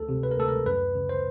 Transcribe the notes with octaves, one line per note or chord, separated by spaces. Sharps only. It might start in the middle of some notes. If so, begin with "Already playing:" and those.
Already playing: D2 A4
C3
B4
A#4
D2 A4
A#4
F#2 B4
C#3
C5